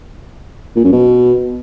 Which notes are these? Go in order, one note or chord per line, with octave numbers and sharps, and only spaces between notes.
A#2
F#2
B2